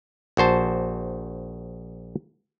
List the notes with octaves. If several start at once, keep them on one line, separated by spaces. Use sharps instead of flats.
A#1 F#4 C5 A5